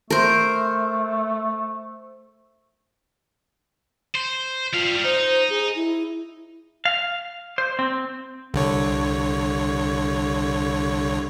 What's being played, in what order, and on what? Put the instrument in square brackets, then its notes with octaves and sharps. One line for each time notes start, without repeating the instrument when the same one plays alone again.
[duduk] A3 [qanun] A#4 C5
[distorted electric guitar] C5
[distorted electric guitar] G3 F5 [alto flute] F4
[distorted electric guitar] D#4 [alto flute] C5
[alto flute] G#4
E4
[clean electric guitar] F5
C5
C4
[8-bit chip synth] C2 D3 C#5